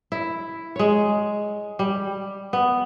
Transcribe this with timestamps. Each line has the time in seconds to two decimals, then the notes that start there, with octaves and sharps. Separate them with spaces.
0.12 E4
0.76 G#3 C#5
1.79 G3
2.53 B3